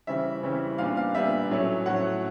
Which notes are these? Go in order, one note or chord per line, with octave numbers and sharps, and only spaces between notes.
C#3 E3 G3 C4 E5
C#3 E3 G3 C4
A#2 G3 B3 D4 F5
F5
A#2 G3 B3 D4 E5
A2 F#3 A3 C#4
A2 F#3 A3 C#4 F#5